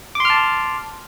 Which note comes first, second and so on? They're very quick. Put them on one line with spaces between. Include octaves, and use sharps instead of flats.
D6 C6 F6 A5